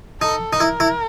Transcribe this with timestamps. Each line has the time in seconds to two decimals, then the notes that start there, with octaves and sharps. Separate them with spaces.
0.21 D#4 A4
0.53 D#4
0.60 E4 A#4
0.80 E4